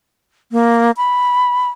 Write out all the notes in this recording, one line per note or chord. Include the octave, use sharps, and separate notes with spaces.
A#3
B5